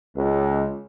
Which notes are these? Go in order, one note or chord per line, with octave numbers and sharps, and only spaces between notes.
C#2